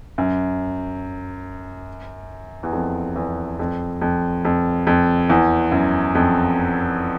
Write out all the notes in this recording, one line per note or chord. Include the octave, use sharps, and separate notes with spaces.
F#2
E2
F2
E2
F2
F2
F2
F2
E2
F#2
F2